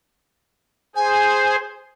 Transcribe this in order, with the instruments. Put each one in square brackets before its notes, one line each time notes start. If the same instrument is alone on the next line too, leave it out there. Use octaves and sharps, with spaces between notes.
[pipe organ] G#4 C5 [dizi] G#5